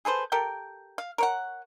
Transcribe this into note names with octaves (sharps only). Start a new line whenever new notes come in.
G#4 A4 B4 C5
G4 A4 A#4 G5
F5
A#4 C#5 F#5